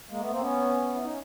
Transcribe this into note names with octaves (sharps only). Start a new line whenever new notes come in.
G#3 A#3
A3 B3
A#3 C4
B3 C#4
E4
C#4 D#4